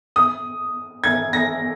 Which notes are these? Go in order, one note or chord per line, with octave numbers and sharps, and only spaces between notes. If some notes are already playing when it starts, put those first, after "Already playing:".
D#6
G#6
A#6